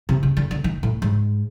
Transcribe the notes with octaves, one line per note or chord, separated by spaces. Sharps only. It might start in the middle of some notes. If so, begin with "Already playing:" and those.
C3
C#3
D3
D3
D#3
A2
G#2